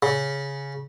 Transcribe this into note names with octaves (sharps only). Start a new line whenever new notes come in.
C#3